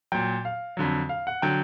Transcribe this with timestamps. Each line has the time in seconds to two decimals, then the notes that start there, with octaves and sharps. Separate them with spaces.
0.12 A#2 F#3 G5
0.45 F5
0.77 F2 D3 F#3
1.09 F5
1.27 F#5
1.42 D3 F#3 G5